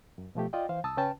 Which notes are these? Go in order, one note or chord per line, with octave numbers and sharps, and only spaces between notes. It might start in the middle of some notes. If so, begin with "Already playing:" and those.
F#2
B2 F3 A3 G4
F4 D5 D#5 G5
E3 C5 F5
C2 A5 D#6 E6
C#3 C#4 B4 G5 A5